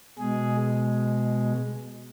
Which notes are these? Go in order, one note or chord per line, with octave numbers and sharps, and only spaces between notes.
B2 G#3 G#4